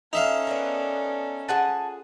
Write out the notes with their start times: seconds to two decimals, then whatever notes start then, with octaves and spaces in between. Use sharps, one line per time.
0.13 C#4 D#4 A4 E5 F5
0.47 B3 D4 A#4
1.49 F4 G#4 F#5 G#5 A5